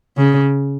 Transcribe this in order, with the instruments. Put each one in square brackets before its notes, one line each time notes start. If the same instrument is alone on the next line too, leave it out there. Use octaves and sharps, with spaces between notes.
[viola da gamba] C#3